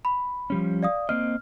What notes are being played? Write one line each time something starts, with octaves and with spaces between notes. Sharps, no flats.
B5
F3 G3 C#4
D5 F5 D#6
A#3 C4 D#5 F6